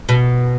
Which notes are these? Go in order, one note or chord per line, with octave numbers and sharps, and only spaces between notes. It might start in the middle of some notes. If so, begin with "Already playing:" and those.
B2